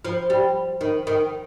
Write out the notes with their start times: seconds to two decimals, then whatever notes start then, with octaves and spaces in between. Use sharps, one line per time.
0.05 F3
0.30 G3
0.81 D#3
1.07 D#3